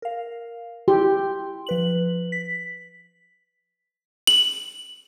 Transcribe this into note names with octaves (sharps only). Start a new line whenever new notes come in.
A#4 F5
E4 G4 C6
F3 B4 F#7
B6
F#7